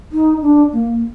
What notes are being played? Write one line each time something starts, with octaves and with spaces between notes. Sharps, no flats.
D#4
D4
A#3